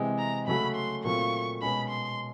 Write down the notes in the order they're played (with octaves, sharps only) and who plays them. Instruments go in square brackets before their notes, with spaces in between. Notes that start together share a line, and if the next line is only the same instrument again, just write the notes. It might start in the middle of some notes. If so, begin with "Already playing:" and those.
Already playing: [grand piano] C3 E3 G#3 C4
[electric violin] A#5
[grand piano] C#3 F#3 A3 C#4 F#4 [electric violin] B5
[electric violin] C6
[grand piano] A#2 F#3 A3 C4 F4 [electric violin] C#6
[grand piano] B2 G#3 C#4 [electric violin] B5
[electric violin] C6